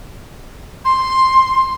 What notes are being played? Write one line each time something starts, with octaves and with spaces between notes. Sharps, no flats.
C6